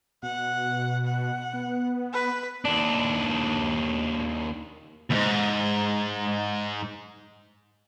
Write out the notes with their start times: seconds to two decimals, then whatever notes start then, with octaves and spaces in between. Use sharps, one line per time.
0.23 B2 F#5
1.07 F#5
1.53 B3
2.13 B4
2.65 D#2 D4
5.11 D#2 G#2